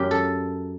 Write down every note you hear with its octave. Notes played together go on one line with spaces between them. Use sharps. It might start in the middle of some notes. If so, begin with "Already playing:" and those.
Already playing: F#2 G4
A4